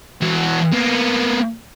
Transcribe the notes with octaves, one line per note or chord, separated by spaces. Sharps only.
E3 F#4
A#3 B3